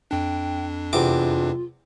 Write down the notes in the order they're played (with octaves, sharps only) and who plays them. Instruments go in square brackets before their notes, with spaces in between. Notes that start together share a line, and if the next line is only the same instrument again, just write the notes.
[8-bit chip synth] F2 D4 [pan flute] G5
[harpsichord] E2 C3 D6 [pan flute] F4